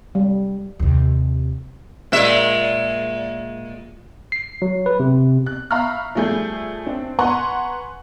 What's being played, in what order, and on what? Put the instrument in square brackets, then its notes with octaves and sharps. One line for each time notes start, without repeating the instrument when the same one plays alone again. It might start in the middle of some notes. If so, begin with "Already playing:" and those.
[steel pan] G3
[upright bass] D#2 C3
[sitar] A#2 G#3 E5
[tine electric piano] C7
F#3
B4
C3
[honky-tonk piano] F#6
E5 F5 A#5 B5 C#6 F6
F3 G3 A3 G#4 G6
C4 D4
B4 F#5 G#5 A#5 C6 C#6